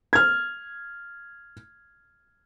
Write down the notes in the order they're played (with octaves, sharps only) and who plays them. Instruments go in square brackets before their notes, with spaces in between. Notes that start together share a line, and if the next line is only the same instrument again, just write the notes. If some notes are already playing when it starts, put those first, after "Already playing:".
[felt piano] F6 G#6